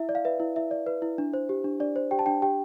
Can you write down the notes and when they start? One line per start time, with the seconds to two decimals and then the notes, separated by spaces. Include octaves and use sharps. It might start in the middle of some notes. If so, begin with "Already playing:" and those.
Already playing: E4 E5
0.09 D5
0.15 F5
0.25 B4 E5
0.40 E4
0.56 E4 E5
0.71 D5
0.86 B4
1.02 E4
1.18 D4
1.34 C5
1.49 G4
1.64 D4
1.80 D4 D5
1.96 C5
2.11 G4 G5
2.19 A5
2.26 D4 G5
2.42 G4 G5